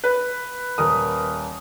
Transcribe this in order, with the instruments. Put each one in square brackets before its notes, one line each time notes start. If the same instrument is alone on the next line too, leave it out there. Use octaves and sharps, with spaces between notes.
[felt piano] B4
[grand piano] D#1 A#4 D#6